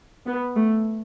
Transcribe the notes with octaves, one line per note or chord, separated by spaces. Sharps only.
B3
A3